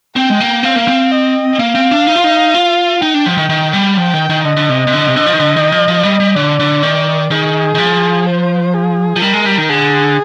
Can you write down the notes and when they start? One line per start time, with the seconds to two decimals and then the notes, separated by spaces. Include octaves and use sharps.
0.16 C4 G5
0.30 G#3
0.40 A#3
0.63 C4 F5
0.76 A#3
0.88 C4
1.11 D#5
1.59 A#3 F5
1.75 C4
1.91 D4
2.07 D#4
2.15 F4
2.24 D#4
2.54 F4
3.01 D#4 G5
3.14 D4
3.26 F3
3.38 D#3
3.50 D#3
3.73 G3
3.97 F3 G5
4.14 D#3
4.30 D#3
4.45 D3 D#5
4.57 D3
4.69 C3
4.87 C3
4.93 D3
5.07 C3
5.16 D3
5.26 F3
5.33 D#3
5.40 D3
5.56 D#3
5.72 F3
5.88 F3
6.03 G3
6.20 G3
6.35 D3 D5
6.60 D3
6.83 D#3
7.31 D#3 G#4
7.75 D#3
7.78 F3
8.26 C5
8.74 G#4
9.16 F3
9.22 G3 A#4
9.33 G#3
9.46 G3
9.58 D#3
9.69 D3 G#4